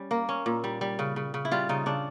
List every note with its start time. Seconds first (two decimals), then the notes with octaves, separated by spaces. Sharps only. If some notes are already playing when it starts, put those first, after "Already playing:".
Already playing: G3 C#4
0.11 A#3
0.29 C#4
0.46 A#2
0.64 G3
0.81 G3
0.99 C#3
1.16 C#3
1.34 C#3
1.45 E4
1.51 G3 F4
1.69 C#3 D#4
1.86 C#3 D4